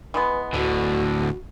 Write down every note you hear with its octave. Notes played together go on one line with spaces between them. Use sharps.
E3 G#3 B3 B4
D2 A2 D3 F#4